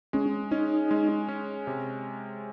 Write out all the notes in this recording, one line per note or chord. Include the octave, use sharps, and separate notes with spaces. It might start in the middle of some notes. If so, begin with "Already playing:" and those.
G#3 C#4
C#4 D#4
G#3
C#4
C3